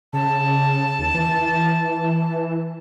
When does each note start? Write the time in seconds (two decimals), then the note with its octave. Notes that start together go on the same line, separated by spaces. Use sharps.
0.13 C#3 A5
0.99 D#2
1.14 E3